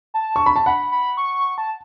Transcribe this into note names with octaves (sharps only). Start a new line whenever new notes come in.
A5
C#6
B5
A5
F#5 B5
B5
C#6
A5